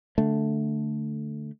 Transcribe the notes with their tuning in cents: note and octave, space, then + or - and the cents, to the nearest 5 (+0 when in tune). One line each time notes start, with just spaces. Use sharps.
D3 +0 A3 +0